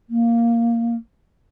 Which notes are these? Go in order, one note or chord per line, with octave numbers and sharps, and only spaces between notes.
A#3